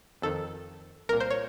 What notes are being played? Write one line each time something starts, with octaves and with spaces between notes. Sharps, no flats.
F2 D#3 A4
C2 A#2 A#4
C5
C#5